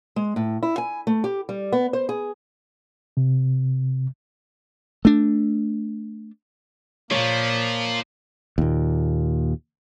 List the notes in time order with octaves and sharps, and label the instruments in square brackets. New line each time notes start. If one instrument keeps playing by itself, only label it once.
[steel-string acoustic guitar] G#3
A2
E4
G#5
A3
G4
G3
B3
C5
G#4
[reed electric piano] C3
[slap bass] A3 D4
[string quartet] A#2 [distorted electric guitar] F3 [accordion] A#3 [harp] C#5
[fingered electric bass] D#2 A#2